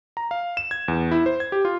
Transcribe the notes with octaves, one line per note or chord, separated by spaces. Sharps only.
A#5
F5
E7
G#6
E2
E4
C5
G#6
G4
F4